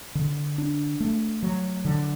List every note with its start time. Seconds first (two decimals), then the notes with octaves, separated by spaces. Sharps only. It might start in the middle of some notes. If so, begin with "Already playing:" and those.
0.15 D3
0.58 D4
1.00 A3
1.43 F#3
1.85 D3